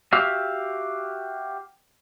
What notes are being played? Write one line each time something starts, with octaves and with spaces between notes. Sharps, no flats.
F#4 G4 E5 F5